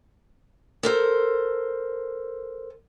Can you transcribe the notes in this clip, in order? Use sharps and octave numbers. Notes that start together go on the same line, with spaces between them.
A4 A#4 C5